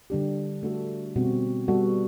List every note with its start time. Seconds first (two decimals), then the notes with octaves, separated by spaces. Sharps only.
0.10 D3 G3 D4 G4
0.63 A3 D4 F#4 A4
1.16 B2 G3 C4 F#4
1.68 G3 B3 F#4 A4